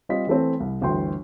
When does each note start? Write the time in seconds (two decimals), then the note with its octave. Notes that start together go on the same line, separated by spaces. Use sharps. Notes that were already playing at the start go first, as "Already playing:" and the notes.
0.09 G3 C4 F4 D#5 B6
0.27 E3 A3 C4
0.60 C2
0.81 G1 D2 E3 G5 C6